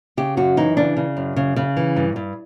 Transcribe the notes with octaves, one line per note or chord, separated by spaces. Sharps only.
C#3 G4
F#2 F#4
E3 D#4
C#3 D4
C#3
F#2
C#3
C#3
E3
G2
G2